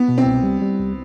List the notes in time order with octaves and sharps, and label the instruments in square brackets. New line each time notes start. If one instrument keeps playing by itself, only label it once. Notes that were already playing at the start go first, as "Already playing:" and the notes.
Already playing: [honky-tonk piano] B3
[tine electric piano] B2
[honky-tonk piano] C4
[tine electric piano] C2
G3
G3
C2